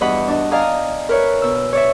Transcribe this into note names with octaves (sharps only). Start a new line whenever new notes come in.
E2 G2 F#4 D#5 F#5 B5
D4 D#5
D5 D#5 F5 G#5 A#5 D#6
A#4 B4 C#5 E5
B2 E6
C#5 D5 E5